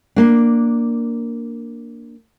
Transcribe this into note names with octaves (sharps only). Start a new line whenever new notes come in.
A#3 D4